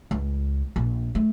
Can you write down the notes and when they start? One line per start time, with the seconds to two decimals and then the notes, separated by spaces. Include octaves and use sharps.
0.11 C#2
0.76 A#1
1.15 A3